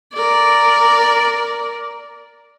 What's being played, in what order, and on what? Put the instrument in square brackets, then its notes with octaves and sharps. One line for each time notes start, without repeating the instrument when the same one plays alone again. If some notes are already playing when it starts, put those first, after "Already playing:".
[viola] A#4 D5